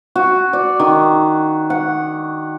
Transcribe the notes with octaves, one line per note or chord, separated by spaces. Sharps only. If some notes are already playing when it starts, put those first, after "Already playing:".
F#4
D5
D#3
F#5